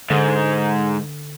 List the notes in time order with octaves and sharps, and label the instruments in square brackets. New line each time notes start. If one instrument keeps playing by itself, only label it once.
[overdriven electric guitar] G#2 [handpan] D3